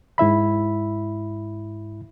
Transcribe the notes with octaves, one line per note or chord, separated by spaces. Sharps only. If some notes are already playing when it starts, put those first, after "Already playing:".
G#2 E4 E5 B5